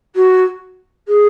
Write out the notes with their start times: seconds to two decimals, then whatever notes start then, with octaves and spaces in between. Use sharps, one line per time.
0.15 F#4
1.08 G#4